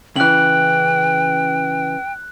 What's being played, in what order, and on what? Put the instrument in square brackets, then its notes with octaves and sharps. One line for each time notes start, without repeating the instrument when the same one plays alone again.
[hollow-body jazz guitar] C#3 E3 [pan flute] G5 [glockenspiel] F#6 F#7